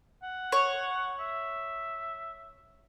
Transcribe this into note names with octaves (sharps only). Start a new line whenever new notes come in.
F#5
C#5
E5